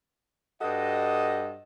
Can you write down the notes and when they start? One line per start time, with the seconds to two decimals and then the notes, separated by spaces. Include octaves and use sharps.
0.61 G2 F#4 A4 D#5